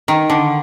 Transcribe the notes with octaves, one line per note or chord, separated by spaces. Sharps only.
D#3
D3